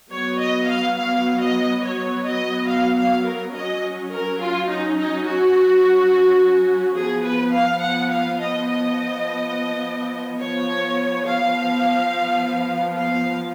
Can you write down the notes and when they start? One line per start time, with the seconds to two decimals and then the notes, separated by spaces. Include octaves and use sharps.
0.11 F#3 B3 C#5
0.39 D#5
0.67 F5
0.96 F5
1.39 D#5
1.82 C#5
2.24 D#5
2.68 F5
2.96 F5
3.25 A#4
3.53 F#3 C#4 D#5
4.11 A#4
4.40 F4
4.68 D#4
4.96 D#4
5.24 F#4
6.97 F3 B3 G#4
7.25 B4
7.53 F5
7.82 F#5
8.11 F5
8.40 D#5
8.68 D#5
10.39 F3 B3 C#5
11.25 F5
12.96 F5